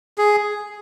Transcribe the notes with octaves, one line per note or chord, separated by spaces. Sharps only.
G#4